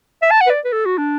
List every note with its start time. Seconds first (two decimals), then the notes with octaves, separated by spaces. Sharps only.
0.22 E5
0.31 A5
0.41 F#5
0.47 B4
0.50 D5
0.65 B4
0.72 A4
0.86 F#4
0.98 D4